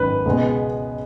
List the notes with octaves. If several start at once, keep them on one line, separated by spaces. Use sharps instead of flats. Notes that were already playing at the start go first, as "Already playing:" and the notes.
Already playing: G#1 F#2 D#3 B4
C#2 B2 G#3 B3